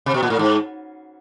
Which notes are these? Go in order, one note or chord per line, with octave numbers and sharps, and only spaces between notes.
C3
B2
A#2
A2
G#2